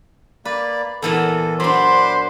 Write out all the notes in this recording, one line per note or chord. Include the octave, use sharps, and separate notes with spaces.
A#3 B4 D5
E2 A#2 E3 A4
F#3 D4 C5 B5 C6 D6